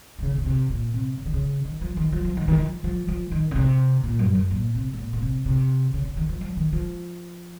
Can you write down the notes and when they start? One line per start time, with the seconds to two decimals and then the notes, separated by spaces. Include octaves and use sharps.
0.19 D#3
0.22 C#3
0.38 A#2
0.46 C3
0.70 A#2
0.94 C3
1.17 C#3
1.26 D#3
1.34 C#3
1.65 D#3
1.81 F3
1.97 D#3
2.12 F3
2.25 F3
2.37 D#3
2.48 D#3
2.60 F3
2.84 F3
3.08 F3
3.31 D#3
3.51 C#3
3.56 C3
4.04 A#2
4.19 F#2
4.35 F#2
4.51 A#2
4.75 C3
4.93 A2
4.98 A#2
5.13 A#2
5.22 C3
5.46 C3
5.94 C#3
6.05 C#3
6.17 D#3
6.29 F3
6.41 F3
6.57 D#3
6.73 F3